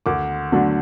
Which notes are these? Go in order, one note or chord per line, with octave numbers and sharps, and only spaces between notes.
D2 D6
D3 F#3 A3 D4